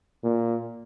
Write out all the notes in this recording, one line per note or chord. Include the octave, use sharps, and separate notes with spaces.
A#2